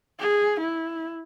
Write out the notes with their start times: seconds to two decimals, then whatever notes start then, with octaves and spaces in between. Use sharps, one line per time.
0.20 G#4
0.61 E4